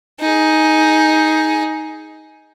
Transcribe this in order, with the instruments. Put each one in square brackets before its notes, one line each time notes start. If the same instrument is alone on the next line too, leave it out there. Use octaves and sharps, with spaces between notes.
[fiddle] D#4 G#4